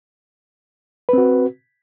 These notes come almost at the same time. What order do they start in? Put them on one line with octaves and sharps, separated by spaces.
B4 C4 F#4